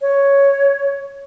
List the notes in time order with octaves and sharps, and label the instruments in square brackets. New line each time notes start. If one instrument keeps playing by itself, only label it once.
[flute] C#5